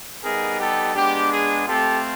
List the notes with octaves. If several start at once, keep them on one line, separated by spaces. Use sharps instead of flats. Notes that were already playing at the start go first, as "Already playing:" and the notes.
G3 B3 D#4 G#4 A#4
G4 A4
G#3 B3 D4 G4
G#4
A3 C4 F4 G4 A4